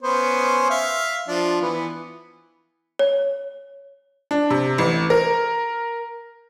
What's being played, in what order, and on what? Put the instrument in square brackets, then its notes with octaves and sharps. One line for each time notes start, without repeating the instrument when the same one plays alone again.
[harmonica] B3 C#4 C5
E5 F5
F3 D4
E3 B3
[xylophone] C#5
[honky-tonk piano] D4
C3
A1
A#4